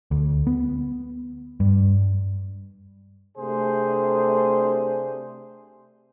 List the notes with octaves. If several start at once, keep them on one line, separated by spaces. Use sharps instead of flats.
D2
B3
G2
C3 A3 D4 G#4 C5